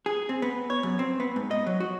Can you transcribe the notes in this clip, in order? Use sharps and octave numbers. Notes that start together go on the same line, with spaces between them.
G#4
C4
B3
C#5
F#2
C4
B3
G#2
D#5
F#3
F#4